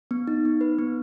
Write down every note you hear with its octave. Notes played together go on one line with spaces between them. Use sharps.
B3
D#4
B3
B4
B3